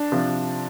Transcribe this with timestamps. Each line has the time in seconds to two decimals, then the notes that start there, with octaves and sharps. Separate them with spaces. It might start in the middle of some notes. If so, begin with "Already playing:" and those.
Already playing: D4
0.12 C3 F3